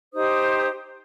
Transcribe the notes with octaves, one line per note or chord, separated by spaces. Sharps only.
D#4 G4 C5 D#6